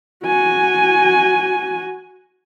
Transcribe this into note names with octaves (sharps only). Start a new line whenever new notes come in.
F#4 G#5